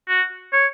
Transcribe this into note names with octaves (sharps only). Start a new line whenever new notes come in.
F#4
C#5